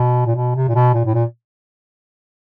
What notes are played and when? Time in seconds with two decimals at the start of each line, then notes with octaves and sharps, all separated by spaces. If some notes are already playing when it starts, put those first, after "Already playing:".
Already playing: B2
0.26 A#2
0.35 B2
0.55 C3
0.68 A#2
0.75 B2
0.94 A#2
1.05 A2
1.15 A#2